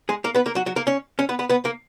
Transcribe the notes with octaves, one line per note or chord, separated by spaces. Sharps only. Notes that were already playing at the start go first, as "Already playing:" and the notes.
G#3 G#4
A#3 A#4
B3 B4
A#3 A#4
F#3 F#4
F#3 F#4
A#3 A#4
C#4 C#5
C#4 C#5
B3 B4
B3 B4
B3 B4
A#3 A#4